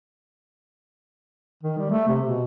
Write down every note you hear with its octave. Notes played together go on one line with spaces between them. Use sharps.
D#3
G3
A3
C3
B2